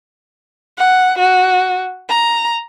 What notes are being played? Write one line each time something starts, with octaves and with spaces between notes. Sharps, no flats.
F#5
F#4
A#5